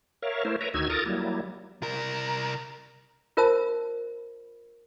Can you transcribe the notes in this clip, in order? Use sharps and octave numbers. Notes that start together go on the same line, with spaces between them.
A#4 C#5 E5 F5
A3 E4 A#4 C5
A#4 B4 C#5 E5 A#5
D2 D#3 D#4 F#4 E6 G#6
F4 A4 A#4 A#5 D#6 A6
F#3 G3 A#3 E4
C2 A#4
F4 A#4 C5 E5 A5 E6